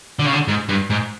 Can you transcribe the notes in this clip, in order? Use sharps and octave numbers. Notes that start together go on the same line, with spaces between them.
D3
C#3
D3
G#2
G2
G#2